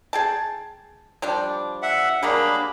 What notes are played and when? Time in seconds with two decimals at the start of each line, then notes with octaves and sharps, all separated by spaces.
0.13 G#4 G5 A5
1.22 F3 G3 D4
1.82 E5 F#5
2.23 F#3 G3 A#3 D4 G#4 B5